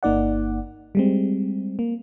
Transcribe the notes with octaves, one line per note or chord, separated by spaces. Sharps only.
G1 A#3 D#4 D5 F#5
G3 G#3 C4
A#3